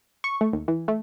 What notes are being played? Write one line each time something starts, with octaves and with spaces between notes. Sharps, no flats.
C#6
A3
D#2
E3
A3